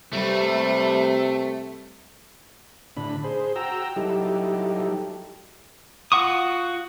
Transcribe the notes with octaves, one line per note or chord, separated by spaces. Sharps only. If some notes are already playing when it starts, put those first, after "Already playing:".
C3 G3 A3 B4
A2 D3 D4 B5
G#4 C5
F#4 G5 A#5 E6
F#3 G3 D#4 E4 G4 A4
F4 F#4 F#5 C#6 D#6